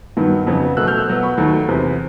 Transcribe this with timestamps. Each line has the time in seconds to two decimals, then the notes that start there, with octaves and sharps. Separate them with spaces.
0.17 G2 D#3 F#3 B3
0.47 F2 C#3 F#3 B3
0.77 B2 F#3 A3 E6 F#6
0.87 F6 G6
0.98 E6 F#6
1.07 B2 F#3 B3
1.23 B5 C#6
1.37 D#2 D#3 F#3 A3
1.68 E2 C3 E3